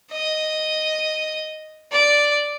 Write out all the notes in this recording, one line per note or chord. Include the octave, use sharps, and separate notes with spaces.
D#5
D5